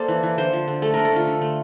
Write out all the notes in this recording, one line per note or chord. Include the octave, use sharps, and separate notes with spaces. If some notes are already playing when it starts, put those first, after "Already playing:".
Already playing: A#3 A4 C5 D5
E3
E3
D3 C5
F3
D3
A3 A4
D3 A#4
A4
D3 F4
D3
A3